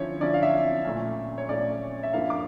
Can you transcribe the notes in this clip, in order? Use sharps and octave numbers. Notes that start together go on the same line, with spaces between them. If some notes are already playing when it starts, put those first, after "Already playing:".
Already playing: D3 F3 C#4 E4 C#5
D3 F3 C#4 E4 D5
F5
E5
A#2 A3 C#4
C#5
A#2 A3 C#4 D5
E5
G2 F3 A#3 E4 F5
D6